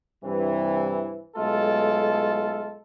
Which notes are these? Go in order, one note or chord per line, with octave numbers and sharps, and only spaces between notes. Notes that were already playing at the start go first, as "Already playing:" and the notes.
G2 C3 E3
B1 G#3 A3 F4 A4